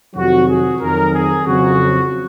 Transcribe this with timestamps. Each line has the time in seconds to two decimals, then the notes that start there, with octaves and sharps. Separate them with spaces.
0.15 F2 C3 D#3 F#3 F#4
0.48 G#4
0.81 F2 D#3 F#3 A#4
1.13 G#4
1.46 F2 C#3 F#3 F#4